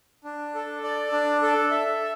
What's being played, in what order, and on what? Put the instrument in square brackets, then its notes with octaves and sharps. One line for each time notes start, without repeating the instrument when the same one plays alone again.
[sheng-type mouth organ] D4
A4
D5
D4
A4
E5